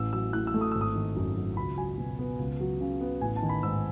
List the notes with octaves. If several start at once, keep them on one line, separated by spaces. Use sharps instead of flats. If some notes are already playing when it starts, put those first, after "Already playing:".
Already playing: A1 E6
F#3 E6
A2 F#6
E6
A3
D#6
G#1 E6
D#6
D#3
F#2
F#3
C#2 B5
F#3 G#5
B2
B3
C#2
F#3
C#3
B3
A1 G#5
A5
D#3
B5
G#2 E6